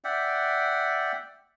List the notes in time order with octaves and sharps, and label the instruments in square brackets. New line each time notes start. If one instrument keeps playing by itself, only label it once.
[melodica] D5 E5 F#5 G5